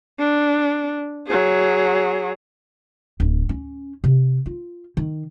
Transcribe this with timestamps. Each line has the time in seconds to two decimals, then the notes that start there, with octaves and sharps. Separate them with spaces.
0.19 D4
1.27 F#3 G#4
3.20 D1
3.49 C#4
4.04 C3
4.46 F4
4.97 D#3